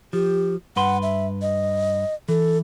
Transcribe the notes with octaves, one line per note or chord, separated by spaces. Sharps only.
F3 G4
G2 B4 F#5 C6
E5
D#5
E3 A4